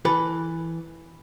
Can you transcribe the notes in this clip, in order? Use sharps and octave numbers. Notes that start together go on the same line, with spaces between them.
E3 A4 B4